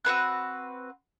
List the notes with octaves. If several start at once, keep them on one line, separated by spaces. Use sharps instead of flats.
C4 F#4 B4 F#6